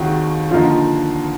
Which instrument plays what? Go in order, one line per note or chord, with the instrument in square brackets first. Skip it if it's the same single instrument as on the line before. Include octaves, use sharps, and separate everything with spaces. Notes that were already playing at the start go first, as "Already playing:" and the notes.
Already playing: [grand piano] D#2 D#3 G#3 C4 [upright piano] F#4
[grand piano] D3 F3 A#3 D#4 [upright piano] F4